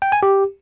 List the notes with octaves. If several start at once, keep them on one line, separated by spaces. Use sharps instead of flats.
G5
G#5
G4